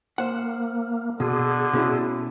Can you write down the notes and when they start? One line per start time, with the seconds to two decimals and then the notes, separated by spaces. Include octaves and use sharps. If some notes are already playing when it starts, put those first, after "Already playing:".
0.18 A#3 C5 F#5
1.20 B2 D3 G#4
1.73 B2 C#4 E4